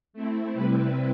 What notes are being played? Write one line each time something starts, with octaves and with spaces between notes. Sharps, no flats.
A3 C4 E4
C3 G3 C4 E4 B4